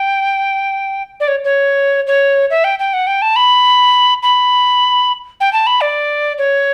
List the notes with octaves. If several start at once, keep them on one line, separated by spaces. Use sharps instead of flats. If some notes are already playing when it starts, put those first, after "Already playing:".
Already playing: G5
D5
C#5
C#5
C#5
E5
G5
G5
F#5
G5
A5
B5
B5
G5
A5
B5
D5
C#5